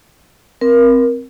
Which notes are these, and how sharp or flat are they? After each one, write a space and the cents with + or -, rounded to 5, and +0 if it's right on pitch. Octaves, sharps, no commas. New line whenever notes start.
C4 +0 A#4 +20